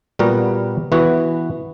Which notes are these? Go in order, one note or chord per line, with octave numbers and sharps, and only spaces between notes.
A#2 G3 B3 F#4 A#4
E3 B3 F#4 B4